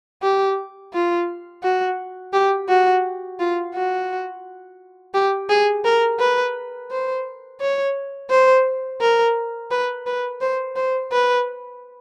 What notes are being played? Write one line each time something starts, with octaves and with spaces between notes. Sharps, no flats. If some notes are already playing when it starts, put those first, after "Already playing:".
G4
F4
F#4
G4
F#4
F4
F#4
G4
G#4
A#4
B4
C5
C#5
C5
A#4
B4
B4
C5
C5
B4